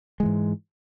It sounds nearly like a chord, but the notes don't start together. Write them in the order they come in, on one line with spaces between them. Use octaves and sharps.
G#3 E3 G#2